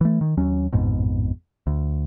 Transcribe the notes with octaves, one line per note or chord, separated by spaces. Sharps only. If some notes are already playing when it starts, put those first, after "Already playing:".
E3 A3
D#3
D#2 F#3 C#4
A1 F2 G#2 B2
D2